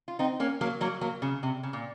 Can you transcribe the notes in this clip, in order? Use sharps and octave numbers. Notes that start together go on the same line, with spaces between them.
F4
C4 D#4
A#3 C#4
F#3 A#3
F#3 A#3
F#3 A#3
C#3
C3
C#3
A#2